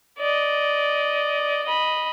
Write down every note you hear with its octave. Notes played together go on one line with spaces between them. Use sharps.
D5 D#5
D#5 B5